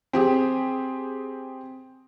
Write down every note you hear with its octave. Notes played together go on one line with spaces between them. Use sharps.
C4 G4 G#4